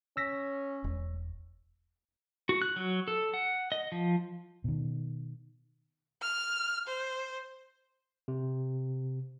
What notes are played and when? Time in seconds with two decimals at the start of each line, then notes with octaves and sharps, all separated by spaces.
0.17 C#4 E6 A#6 B6
0.84 E1
2.49 F#4
2.62 F#6
2.76 F#3
3.08 A4
3.34 F#5
3.72 D#5
3.92 F3
4.64 B2 D#3
6.22 F6
6.87 C5
8.28 C3